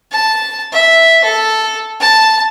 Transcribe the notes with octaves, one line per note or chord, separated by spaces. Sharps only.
A5
E5
A4
A5